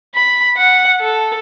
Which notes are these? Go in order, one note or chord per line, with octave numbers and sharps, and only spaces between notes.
B5
F#5
A4